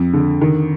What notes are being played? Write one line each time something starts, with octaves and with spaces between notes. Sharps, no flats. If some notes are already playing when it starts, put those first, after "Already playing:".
Already playing: F2
D3
D#3